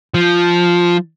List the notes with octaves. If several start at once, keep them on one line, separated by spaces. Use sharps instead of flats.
F3